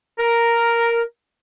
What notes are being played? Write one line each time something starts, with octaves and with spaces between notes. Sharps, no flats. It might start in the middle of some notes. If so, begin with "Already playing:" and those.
A#4